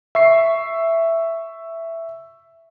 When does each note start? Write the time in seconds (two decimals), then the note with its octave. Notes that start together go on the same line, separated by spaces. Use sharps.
0.15 E5 C#6 C7